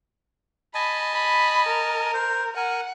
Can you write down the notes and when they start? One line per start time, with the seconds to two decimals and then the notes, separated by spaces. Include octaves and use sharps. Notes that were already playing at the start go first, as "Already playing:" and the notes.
0.75 D#5 G#5 A5 B5
1.14 B5
1.68 A#4
2.14 C5
2.56 A#4 F#5 G#5